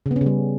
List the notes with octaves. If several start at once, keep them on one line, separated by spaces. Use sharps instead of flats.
C#3
B3
C#4
C#3
G3